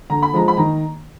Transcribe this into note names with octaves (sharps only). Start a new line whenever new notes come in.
D3 A#5
B5
F3 G#3 A#5
B5
D#3 A#5